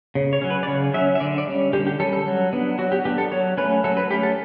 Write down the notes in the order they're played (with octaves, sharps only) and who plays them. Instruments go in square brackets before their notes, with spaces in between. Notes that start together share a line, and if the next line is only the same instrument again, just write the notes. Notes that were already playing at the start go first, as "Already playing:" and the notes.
[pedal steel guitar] C#3
C#5
F#3 C#4
B4
D5
C#3 C#5
F#3 C#4 E5
E5
D3 D5
D5
G3 C#4
D3 G4
G4
G3 C#4 A4
A4
F#3
B3 D4
F#3 F#4
G4
B3 D4 G4
A4
F#3 C#5
A3 C#4 B4
F#3 A4
B4
A3 G4
C#4
A4